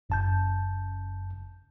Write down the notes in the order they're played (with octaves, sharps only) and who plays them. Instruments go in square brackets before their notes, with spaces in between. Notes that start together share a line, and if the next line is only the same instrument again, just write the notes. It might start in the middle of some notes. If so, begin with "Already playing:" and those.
[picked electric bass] F#1 [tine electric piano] F#2 A5 G6